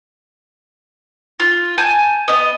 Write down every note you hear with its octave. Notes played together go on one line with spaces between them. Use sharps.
F4
G#5 A5 G6
B3 D#5